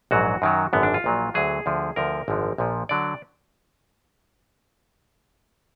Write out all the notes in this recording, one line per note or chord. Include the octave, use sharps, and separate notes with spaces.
A#1 G#2 F#3 F#4
F#2 D#3 F#3
G#1 F#2 D3 B3
D4
F4
A#1 A#2 F#3
D2 D3 F#3 G#4
D2 D3 F3
D2 D3 F3 A#4
G#1 F#2 D3 F3
A#1 A#2 F3
D3 F#3 D5